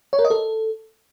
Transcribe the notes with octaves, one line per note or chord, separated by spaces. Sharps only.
C#5
A#4
D#5
A4